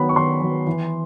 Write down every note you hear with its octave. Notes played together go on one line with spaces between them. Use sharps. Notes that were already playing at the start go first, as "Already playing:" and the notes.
Already playing: D#3 F#3 B3 B5
C#6
D#3 C6
F#3 B3
E3